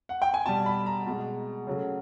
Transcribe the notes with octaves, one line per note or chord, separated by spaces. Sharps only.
F#5
G5
G#5
B2 G3 A5
B5
A#5
B2 G#3
C#3 F#3 A3